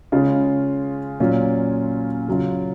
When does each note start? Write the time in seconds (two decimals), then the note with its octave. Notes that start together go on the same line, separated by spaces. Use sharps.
0.12 C#3 G#3 C#4 F4
1.20 A#2 F#3 C#4 F4
2.28 C#3 F#3 C#4 F4